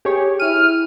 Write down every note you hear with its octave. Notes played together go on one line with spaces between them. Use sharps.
G4 G#4 C#5
E4 F6 D#7